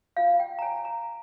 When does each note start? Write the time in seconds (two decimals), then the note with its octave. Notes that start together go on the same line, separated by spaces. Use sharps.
0.17 F4 F5
0.40 G5
0.59 A#5
0.62 C#5 G#5
0.85 A#5